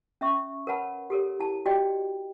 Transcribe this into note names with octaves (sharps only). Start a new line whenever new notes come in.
C#4 E5 C#6
A#4 B4 C#5 F#5 A5 B5
G4 A4 A#4 C#5
E4 A5
F#4 G4 D5 D#5 G5